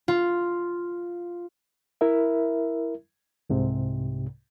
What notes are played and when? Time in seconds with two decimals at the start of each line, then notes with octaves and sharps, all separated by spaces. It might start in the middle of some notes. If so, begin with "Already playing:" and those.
0.08 F4
2.01 E4 A#4 E5
3.50 C2 G#2 C3